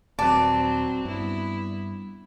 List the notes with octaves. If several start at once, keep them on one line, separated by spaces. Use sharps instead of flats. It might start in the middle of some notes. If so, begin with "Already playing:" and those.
D#1 F#3 C4 B4 D5 A5
G2 B3 E4